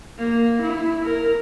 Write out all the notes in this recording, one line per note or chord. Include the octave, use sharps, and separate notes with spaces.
A#3
E4
A#4